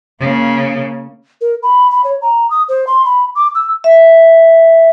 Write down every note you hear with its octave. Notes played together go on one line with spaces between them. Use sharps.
C#3 A#3
A#4
B5
B5
C#5
A#5
D#6
C5
C6
B5
D6
E6
E5